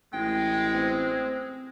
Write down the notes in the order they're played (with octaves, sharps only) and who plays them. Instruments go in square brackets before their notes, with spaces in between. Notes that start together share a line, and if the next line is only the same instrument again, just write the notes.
[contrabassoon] A1 [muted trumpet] G#3 [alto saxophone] G5
[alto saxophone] C4